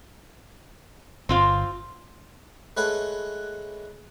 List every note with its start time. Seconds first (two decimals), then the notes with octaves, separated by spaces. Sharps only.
1.29 G1 C4 F4 F5
2.77 G#3 A3 A4 B4 C#5 F#5